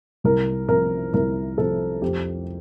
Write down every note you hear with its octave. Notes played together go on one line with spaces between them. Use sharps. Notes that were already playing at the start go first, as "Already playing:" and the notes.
C2 A#4
C3 F3 A#4
C2 A#4
C3 F3 A4
F2 G4